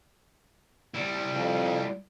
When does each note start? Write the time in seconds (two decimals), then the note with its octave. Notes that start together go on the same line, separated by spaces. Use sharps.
0.95 G3 E4
1.34 F2